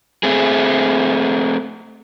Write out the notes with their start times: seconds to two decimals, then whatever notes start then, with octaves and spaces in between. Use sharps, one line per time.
0.23 A3 C4 G#4